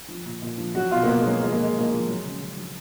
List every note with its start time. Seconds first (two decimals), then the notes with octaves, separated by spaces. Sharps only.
0.08 F3
0.25 A#2
0.42 A#2
0.58 F3
0.75 F#3 F#4
0.91 B2 F4
1.03 A#3
1.08 B2 B3
1.20 G#3
1.25 F#3 A#3
1.41 F3 G#3
1.52 A#3
1.58 A#2
1.63 G#3
1.74 A#2 A#3
1.85 G#3
1.91 F3
2.08 F#3
2.25 C#3
2.40 C#3
2.57 F#3